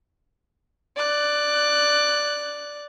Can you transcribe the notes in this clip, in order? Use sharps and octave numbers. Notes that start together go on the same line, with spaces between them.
D5 F#6